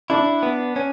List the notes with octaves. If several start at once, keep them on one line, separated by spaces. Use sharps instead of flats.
D4 E4
B3
C#4